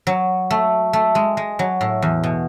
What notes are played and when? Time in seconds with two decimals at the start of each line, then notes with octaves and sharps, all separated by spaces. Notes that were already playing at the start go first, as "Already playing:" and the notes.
0.07 F#3
0.51 A3
0.93 A3
1.15 G#3
1.37 G#3
1.59 F#3
1.81 A2
2.02 E2
2.24 B2